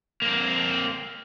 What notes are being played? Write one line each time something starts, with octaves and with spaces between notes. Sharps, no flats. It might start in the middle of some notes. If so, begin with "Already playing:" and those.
A#3 C4